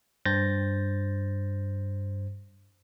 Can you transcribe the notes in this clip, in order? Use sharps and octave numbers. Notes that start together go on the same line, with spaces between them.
G2 C5 G6 A6 A#6